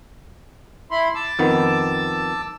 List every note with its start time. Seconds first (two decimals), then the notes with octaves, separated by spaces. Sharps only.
0.91 E4 B5 C6
1.15 A5 D6 E6
1.39 F2 D#3 B3